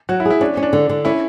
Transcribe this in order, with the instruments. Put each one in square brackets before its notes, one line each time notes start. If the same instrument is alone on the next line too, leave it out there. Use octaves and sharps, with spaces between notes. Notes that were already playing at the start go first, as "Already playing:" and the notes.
[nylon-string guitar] F#3 [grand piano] F#4
[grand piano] E4
[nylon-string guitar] G#4
[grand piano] E4
[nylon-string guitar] C#4 [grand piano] D4
[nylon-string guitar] C#4
[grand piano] D4
[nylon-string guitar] D3
D3
[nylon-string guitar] C#4 [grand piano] E4